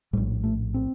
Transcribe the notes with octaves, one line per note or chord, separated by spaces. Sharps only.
A#1 A2 G3
A3
C4